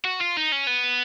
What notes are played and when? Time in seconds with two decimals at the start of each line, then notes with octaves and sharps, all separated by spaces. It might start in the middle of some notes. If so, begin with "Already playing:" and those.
0.04 F#4
0.21 F4
0.37 D#4
0.52 C#4
0.67 B3